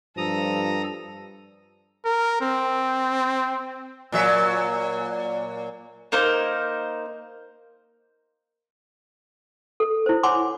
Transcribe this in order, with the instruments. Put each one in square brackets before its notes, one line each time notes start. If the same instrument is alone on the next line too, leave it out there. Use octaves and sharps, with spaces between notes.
[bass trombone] G2 [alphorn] F3 [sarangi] A4 [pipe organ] A#5 D#6
[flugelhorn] A#4
C4
[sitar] A#2 F#3 E5
[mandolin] A#3 D#4 A#4 C5
[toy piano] A4
E4 C5
C#5 F#5 G#5 B5 C6 D6